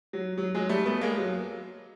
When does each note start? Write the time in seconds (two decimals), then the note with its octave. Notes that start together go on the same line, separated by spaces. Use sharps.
0.13 F#3
0.38 F#3
0.55 F#3 G#3
0.69 G3 A3
0.85 A3 B3
1.01 G#3 A#3
1.18 F#3